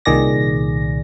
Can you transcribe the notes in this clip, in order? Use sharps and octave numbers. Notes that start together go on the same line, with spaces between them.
C2 A#2 D#3 G#4 D5 A#6